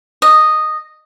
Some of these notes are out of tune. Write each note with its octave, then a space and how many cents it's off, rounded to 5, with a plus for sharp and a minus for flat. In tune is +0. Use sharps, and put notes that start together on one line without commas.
D#5 -5